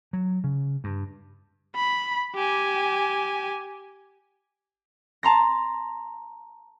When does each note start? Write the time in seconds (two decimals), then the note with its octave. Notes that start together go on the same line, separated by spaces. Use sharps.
0.13 F#3
0.44 C#3
0.84 G2
1.76 B5
2.35 G4 G#5
5.23 A5 A#5 C6 A#6